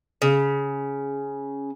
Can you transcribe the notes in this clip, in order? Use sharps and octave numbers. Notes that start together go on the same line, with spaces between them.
C#3